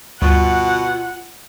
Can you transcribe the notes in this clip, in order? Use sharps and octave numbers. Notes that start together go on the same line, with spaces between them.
D2 G2 B2 F4 F#5